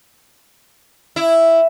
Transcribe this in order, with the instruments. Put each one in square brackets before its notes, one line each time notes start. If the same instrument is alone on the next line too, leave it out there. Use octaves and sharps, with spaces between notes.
[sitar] E4